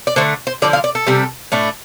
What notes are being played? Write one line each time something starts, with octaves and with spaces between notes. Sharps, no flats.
D5
D3 A3 D4 C5
C5
D3 F3 D4 D5
F5
D5
A4
C3 G3 C4
A2 A3 D4